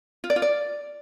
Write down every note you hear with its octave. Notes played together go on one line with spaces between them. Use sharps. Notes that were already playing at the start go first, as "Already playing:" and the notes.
F4
D5
F4
D5